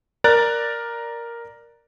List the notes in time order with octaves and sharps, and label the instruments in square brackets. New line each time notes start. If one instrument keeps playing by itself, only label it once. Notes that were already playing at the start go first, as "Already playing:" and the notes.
[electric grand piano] A#4 D5 A#5 F#6 A6